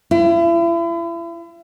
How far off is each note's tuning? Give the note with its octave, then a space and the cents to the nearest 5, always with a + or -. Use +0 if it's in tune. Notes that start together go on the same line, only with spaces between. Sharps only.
E4 +40